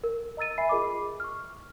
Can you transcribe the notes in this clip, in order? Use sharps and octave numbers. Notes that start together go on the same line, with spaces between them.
A#4
D#5 A#5 E6 A6 D#7
E5 G#5 B5 C7
F4 G#4 A#4 D#5 B5 D6
C#6 F6